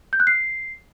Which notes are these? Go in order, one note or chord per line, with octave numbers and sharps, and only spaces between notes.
G6
F#6
C7